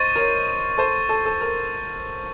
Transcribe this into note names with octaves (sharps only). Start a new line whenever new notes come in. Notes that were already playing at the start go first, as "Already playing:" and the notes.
Already playing: C5 D#5 C#6 A6 D#7
A#4 C#5
A4 C5
A4
A4
A#4